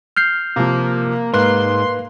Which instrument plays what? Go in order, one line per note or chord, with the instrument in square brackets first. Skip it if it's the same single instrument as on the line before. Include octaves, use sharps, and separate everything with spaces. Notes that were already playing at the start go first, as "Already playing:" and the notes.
[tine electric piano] F6 G6 C7
[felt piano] C3 F3 [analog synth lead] A#3
[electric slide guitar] G#2 [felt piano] A#3 [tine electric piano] B4 F#6 [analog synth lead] C6